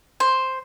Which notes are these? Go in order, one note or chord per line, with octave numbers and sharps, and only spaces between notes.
C5